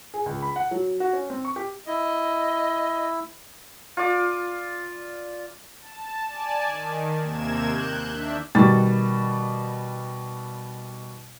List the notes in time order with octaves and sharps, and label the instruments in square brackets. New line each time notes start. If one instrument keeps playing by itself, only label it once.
[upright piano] G#4
C#2
B5
F#5
F#3
F#4
C#4
C4
C#6
G4
[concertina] E4 [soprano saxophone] D#5
[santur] F4 D5
[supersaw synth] A5
D5 G#5 A5
D#3
D#2 C3 A#3 G#6 E7
F#6 G6
D#3 D4 E5
[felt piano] B2 D#3 G3 A6